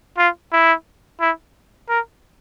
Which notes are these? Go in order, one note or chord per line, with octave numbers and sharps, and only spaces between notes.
F4
E4
E4
A#4